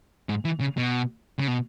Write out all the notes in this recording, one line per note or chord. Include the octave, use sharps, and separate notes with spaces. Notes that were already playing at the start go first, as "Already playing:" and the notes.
G#2
E3
C#3
B2
C#3
B2